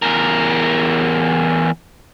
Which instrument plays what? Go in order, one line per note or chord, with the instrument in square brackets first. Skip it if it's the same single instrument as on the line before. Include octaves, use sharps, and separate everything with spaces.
[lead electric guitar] E2 A#4